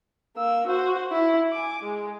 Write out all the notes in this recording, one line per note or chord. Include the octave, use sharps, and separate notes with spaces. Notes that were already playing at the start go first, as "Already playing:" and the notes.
A#3 E6
F#4 C5
E4
G#5 D6
G#3